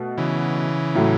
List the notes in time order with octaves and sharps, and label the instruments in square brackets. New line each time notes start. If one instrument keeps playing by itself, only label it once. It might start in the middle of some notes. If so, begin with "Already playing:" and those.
Already playing: [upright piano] B2 A3
[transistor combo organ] C#3 E3
[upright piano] A2 F#3 A3